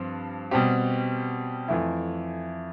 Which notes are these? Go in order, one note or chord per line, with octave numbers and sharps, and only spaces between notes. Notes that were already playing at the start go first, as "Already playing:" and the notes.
Already playing: G2 F3 C4
B2 G3 C4 G4
F2 E3 A3 E4